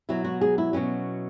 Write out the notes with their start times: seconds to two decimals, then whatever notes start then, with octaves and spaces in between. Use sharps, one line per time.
0.09 B2 F#3 E4
0.24 F#4
0.41 G#4
0.58 E4
0.73 B2 F#3 C#4